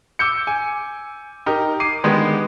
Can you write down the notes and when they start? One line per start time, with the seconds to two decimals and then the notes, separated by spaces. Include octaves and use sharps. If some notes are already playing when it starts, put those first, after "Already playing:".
0.19 D6 E6 G6 C#7
0.47 G#5
1.46 D#4 G4 A#4
1.80 D6 C7 D#7
2.04 D3 D#3 G#3 B3 G4